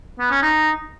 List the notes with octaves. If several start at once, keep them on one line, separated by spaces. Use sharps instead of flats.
B3
C#4
D#4